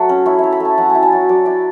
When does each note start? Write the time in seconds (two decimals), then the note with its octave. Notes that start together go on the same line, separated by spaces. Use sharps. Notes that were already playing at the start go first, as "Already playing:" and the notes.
Already playing: F#3 A3 F#4 A4
0.09 C#4
0.26 E4 C#5
0.39 E4 E5
0.52 B5
0.60 A3 A5
0.77 F#3 F#5
0.90 G#5
0.95 E4
1.03 A5
1.12 F#3
1.29 F#3 D5
1.46 E4 D5